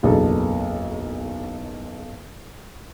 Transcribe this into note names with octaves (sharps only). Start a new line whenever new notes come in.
F#1 B1 E2 D4 G#4 A4